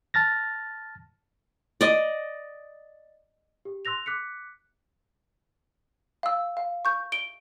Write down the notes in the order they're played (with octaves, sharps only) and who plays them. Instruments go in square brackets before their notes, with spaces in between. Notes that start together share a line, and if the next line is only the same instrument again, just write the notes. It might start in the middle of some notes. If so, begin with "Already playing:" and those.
[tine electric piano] A5 F6 A6 A#6
[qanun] D5 D#5
[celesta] G4
C6 E6 F#6 A#6 F7
D6 F#6 B6 C#7
[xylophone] F5 E6
F5
C#6 G6
D7 G7